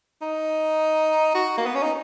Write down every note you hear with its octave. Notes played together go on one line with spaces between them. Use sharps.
D#4
F#4
A#3
B3
C#4
D#4